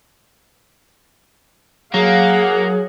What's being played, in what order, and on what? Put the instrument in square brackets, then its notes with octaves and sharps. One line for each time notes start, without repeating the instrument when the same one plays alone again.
[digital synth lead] F#3 [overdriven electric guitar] A#3 [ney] G#4 [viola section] F5 F#5